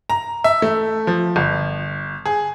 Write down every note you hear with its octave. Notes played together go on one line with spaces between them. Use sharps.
A#5
E5
A3
F3
G1
G#4